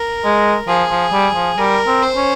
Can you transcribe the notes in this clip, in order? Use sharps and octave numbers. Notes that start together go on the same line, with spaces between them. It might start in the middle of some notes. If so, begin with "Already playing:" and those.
Already playing: A#4
G#3
F3 G#4
F3
G3
F3
G3 A#4
C4
C5
C#4